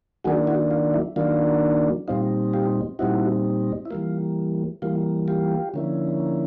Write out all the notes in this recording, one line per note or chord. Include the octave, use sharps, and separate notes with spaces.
D#3 F#3 A#3 D4 F#4 G#4
E4 F#4
F4
E4
D#3 F#3 A#3 D4 F4
A#2 G3 C4 D#4 F4
F4 G4
A#2 G3 C4 D#4 E4 F#4
E4
E3 G3 A#3 F4
E3 G3 A#3 F4
F4 G4
D3 F3 A#3 C#4 E4